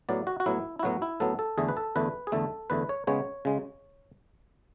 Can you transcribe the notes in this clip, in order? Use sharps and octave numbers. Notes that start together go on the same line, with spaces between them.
A2 F#3 B3 D5
F#4
F#4
A2 F#3 B3 E4
E4
A2 F#3 B3 F#4
E4
A2 F#3 B3 A4
A4
E2 D3 A3 G#4
B4
A4
E2 D3 A3 B4
G#4
E2 D3 A3 A4
E2 D3 A3 B4
C#5
C#3 G#3 B3 C#5
C#3 G#3